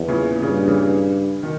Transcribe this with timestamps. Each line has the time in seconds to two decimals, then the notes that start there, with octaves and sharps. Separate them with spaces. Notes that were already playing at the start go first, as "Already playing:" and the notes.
Already playing: E2
0.08 A#2 C#3
0.42 G2 A#2 C#3
0.68 C#3 E3
1.43 B2 D#3